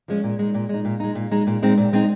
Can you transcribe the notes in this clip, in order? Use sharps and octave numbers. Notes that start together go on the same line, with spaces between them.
F3 G#3 C#4
A#2
G#3 D#4
A#2
G#3 D#4
A#2
G#3 D#4
A#2
G#3 D#4
A#2
G#3 C4 D#4
A#2
G#3 C4 D#4